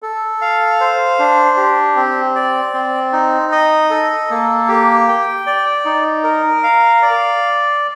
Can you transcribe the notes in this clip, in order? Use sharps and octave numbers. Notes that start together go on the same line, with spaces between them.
A4
F5
C5
D4
G4
C4
D5
C4
D#4
D#5
A4
A#3
G4
G5
D5
D#4
A#4
F5
D5